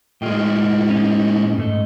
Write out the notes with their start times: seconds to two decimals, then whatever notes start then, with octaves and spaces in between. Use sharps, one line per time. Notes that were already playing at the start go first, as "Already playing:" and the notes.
0.22 A2 G#3 F4 D#5 G5
0.90 C#4 D#4
1.58 G#2 A3 D#5